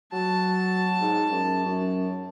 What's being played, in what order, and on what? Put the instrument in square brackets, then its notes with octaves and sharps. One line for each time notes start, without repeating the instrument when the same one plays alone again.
[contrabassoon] F#3 [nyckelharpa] A5
[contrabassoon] G#2
F#2
F#2